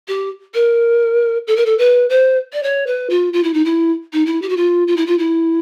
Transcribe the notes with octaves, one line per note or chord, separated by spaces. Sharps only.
G4
A#4
A4
A#4
A4
B4
C5
D5
C#5
B4
F4
F4
E4
D#4
E4
D#4
E4
G4
F#4
F4
F4
E4
F4
E4